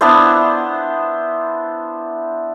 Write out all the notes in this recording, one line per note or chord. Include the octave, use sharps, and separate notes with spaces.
B3 D4 E4 C5